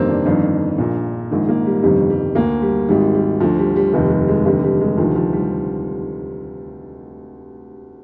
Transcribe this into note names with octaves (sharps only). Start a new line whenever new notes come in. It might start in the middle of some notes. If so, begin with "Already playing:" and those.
Already playing: G1 F2 C3 D#3 A#3 C4
D4
G1 F2 D#3
A#1 A#2
A#1 G#2 D#3
A#3
G3
G1 F2 C3 D#3 G3
G3
D2 D3 A#3
G3
G#1 G#2 D#3 G3
G3
D2 D3 F3
G3
G3
F1 D#2 D#3 G3
G3
G#3
F1 D#2 D3 G3
G3
G#3
D2 C3 D#3 F3
F3
G3